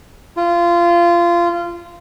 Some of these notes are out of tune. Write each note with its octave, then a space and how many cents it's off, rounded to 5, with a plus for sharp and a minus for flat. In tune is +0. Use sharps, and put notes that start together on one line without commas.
F4 -20